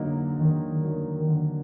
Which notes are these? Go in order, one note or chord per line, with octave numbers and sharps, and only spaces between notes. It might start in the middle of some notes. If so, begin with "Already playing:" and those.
Already playing: D3 F#3 A#3 D#4
D3 D#3
F#3 A#3 D#4
D3